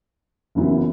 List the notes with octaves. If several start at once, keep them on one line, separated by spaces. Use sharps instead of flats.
F#1 F#2 E3 B3 E4